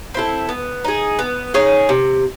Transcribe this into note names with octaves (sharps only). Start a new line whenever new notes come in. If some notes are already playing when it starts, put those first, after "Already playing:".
C4 E4 A4
B3
D#4 G#4
B3
D#4 G#4 C#5
C3